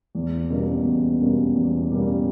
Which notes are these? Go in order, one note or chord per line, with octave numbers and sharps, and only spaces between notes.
E2
B2 G3 A#3 C#4
E2
B2 G3 A#3 C#4
E2
B2 G3 A#3 C#4